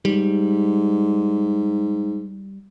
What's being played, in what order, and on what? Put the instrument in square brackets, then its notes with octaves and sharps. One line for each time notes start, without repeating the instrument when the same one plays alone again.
[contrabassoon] G#2 [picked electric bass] G3